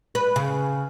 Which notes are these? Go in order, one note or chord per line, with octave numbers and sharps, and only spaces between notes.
B4
C#3